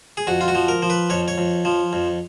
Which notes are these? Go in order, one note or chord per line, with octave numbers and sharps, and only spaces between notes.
G#4
F2 F#4
F4
F#4
F3
A#4
F3
B4
F2 C#5
C#5
F2
F3
F2